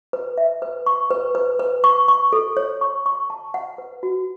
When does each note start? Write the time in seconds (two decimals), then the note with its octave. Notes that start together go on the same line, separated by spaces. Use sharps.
0.13 B4
0.38 E5
0.62 B4
0.86 C#6
1.11 B4
1.35 B4
1.59 B4
1.84 C#6
2.08 C#6
2.33 A4
2.57 C#5
2.81 C#6
3.06 C#6
3.30 A5
3.54 F#5
3.78 B4
4.03 F#4